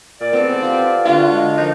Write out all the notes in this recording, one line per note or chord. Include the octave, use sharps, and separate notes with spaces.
A#2 D5
B3 C4 G#4 A4
F4 G4
D3 D4 F4 F#4
G#3
F3 D#4 A#4 C5